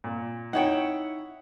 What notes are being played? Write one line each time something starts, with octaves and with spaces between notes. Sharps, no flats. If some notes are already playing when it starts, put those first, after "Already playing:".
A#2
D#4 E4 C#5 F#5 G5